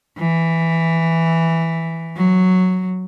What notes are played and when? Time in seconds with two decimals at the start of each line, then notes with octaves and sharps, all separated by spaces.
0.19 E3
2.16 F#3